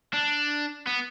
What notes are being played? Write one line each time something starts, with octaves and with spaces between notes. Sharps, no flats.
D4
B3